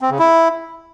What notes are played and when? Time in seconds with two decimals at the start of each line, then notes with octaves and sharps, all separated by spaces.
0.01 C4
0.10 C#3
0.19 E4